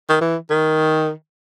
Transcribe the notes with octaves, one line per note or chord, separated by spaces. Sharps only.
D#3
E3
D#3